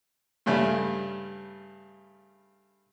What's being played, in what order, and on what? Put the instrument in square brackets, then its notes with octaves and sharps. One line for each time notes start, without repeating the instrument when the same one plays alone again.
[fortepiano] G2 C#3 G3 A3